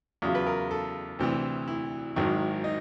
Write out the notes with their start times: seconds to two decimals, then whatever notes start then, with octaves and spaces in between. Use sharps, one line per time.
0.22 E2 C#3 F#3 F4
0.35 B4
0.47 A#4
0.71 A4
1.19 D2 C3 E3
1.68 E4
2.16 G#1 G#2 D#3 F#3
2.64 D#4